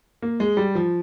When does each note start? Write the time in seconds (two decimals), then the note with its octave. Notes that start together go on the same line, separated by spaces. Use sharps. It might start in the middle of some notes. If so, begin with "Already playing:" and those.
0.22 A#3
0.40 G#3
0.57 G3
0.75 F3